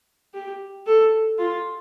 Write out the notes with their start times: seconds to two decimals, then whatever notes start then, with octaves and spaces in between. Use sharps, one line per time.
0.34 G4
0.86 A4
1.39 F4